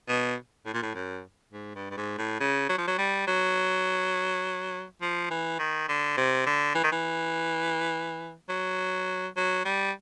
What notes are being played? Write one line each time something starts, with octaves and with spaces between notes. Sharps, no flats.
B2
A2
A#2
A2
F#2
G#2
G2
G2
G#2
A2
C#3
F#3
F3
F#3
G3
F#3
F3
E3
D#3
D3
C3
D3
E3
D#3
E3
F#3
F#3
G3